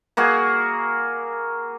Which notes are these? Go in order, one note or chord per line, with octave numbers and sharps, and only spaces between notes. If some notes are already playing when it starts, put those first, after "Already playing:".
A#3 F#4 G#4